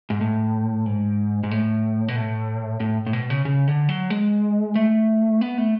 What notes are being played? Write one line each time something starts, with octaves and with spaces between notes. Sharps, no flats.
G#2
A2
G#2
G#2
A2
B2
A2
A2
A2
B2
C#3
C#3
D3
F#3
G#3
A3
B3
A3